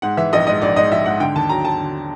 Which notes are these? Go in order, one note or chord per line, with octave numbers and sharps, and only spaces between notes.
G#2 F#5
E3 E5
A#1 D#5
G#2 D#5
A#1 D5
G#2 D#5
A#1 E5
G#2 F#5
D3 G5
D#2 A5
F#3 A#5
F#3 A5
D3